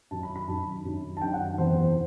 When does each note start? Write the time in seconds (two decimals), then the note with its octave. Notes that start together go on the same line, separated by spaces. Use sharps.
0.11 F#2 D#3 A5
0.23 B5
0.36 B5
0.48 F#2 D#3 A5
0.85 F#2 D#3
1.17 A5
1.21 F#2 D#3 G5
1.34 F#5
1.58 E2 C3 E3 C5